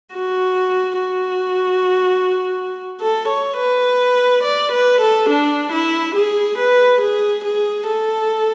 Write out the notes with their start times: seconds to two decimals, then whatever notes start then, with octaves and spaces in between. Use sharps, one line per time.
0.14 F#4
1.00 F#4
3.01 A4
3.29 C#5
3.58 B4
4.44 D5
4.72 B4
5.01 A4
5.30 D4
5.73 E4
6.16 G#4
6.58 B4
7.02 G#4
7.45 G#4
7.88 A4